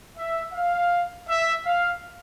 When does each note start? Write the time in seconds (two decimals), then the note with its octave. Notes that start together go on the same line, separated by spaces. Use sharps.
0.18 E5
0.53 F5
1.28 E5
1.65 F5